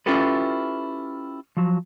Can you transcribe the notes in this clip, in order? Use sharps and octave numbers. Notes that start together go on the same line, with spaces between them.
C#4 E4 F4 G4 A4 B4
F3 F#3